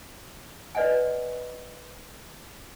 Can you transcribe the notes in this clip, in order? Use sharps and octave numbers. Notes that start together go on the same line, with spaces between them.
B4 D5 D#5 F#5 G#5